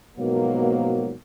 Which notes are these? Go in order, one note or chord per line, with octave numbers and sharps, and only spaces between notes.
G#2 B2 F3 F#3 A#3